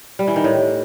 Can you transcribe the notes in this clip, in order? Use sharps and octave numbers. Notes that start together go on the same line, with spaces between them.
G3
E3
D#3
A2